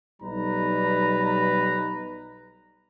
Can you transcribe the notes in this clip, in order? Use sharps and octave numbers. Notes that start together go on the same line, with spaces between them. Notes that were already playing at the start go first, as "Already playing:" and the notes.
B1 G3 D#4 B4 A#5